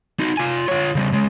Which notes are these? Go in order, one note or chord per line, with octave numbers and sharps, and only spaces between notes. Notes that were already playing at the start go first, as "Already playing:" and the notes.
D#4 F#4
F4 G#5
F4 C#5
C#3 G3
C#2 G#3